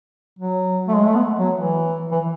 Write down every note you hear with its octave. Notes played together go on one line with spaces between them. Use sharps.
F#3
A3
G#3
A3
B3
F#3
E3
E3